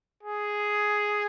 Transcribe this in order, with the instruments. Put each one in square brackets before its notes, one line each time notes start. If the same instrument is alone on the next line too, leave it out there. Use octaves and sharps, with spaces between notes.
[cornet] G#4